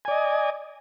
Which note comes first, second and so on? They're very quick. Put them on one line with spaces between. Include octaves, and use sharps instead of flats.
G#5 D5 D#5